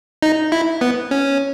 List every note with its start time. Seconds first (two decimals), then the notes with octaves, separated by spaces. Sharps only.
0.22 D#4
0.52 E4
0.81 B3
1.11 C#4